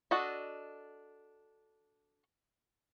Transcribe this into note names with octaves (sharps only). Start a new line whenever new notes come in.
D4 F#4 A4 D#5